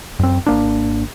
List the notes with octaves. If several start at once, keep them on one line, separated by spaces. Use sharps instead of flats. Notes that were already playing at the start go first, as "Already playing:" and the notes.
F#2 C4
G#1 A#3 D4